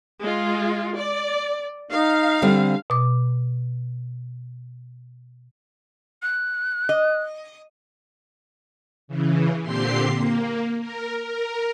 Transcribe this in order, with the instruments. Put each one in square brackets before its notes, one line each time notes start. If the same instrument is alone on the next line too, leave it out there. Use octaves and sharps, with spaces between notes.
[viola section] G#3 F4
D5
[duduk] D#4 [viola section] F5
[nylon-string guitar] D3 G3 C4
[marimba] B2 D6
[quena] F#6
[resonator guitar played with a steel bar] D#5
[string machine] C#3 E3
A#2 D3 C4 G4 C6 C7
A#3
A#4
A#4